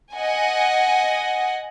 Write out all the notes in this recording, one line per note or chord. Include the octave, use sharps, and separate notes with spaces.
D#5 F#5 G#5